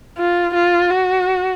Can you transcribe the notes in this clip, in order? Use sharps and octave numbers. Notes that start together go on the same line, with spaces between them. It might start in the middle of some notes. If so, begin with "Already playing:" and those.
F4
F4
F#4